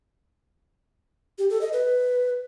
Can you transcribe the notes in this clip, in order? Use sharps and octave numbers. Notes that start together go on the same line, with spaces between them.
G4
A4
D#5
B4